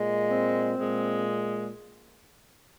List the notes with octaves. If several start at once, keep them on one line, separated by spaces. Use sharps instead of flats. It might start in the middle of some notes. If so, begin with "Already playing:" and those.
Already playing: A#2 G#3
C4
A#2 G#3